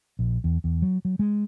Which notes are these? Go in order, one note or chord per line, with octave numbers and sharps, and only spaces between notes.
A#1
E2
E2
F#3
F#3
G#3